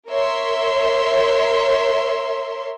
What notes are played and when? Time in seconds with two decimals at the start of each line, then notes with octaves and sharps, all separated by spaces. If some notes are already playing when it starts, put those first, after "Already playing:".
0.10 A#4 C#5 E5 C6